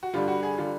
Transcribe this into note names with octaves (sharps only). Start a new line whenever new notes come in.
F#4
G2 D3 G3 F4
F#4
G#4
D3 G3 F4